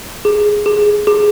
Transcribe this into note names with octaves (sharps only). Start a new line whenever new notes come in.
G#4
G#4
G#4